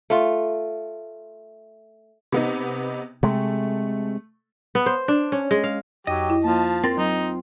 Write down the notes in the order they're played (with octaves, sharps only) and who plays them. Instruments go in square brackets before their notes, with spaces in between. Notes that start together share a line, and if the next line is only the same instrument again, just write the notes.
[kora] A3 F4
[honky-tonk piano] C3 B3 D#4
[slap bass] C3 G#3 [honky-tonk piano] A3
[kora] B3
C5
D4
C#4
G#3
F5
[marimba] F2 [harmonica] F#3 G4 [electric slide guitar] D#5
[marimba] E4
[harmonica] F3 A5 [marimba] A#3
[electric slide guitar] C4 F4 [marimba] A#4 A6 A#6
[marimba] F#3 [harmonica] D#4